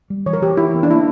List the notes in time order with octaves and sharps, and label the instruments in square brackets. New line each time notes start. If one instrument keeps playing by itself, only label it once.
[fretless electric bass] G3
[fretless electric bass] E3 [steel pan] C#5
[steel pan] A#4
[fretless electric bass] E3 [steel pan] G4
[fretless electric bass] E3 [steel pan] E4
[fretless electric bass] B3
[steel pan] D4
[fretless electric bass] A#3 [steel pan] E4